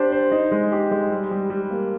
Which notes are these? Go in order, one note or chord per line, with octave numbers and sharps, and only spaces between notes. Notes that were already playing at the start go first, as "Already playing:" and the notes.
Already playing: D4 G4 C5
C5
D#4
G#3
G4
G#3
G3
G3
G3
A#3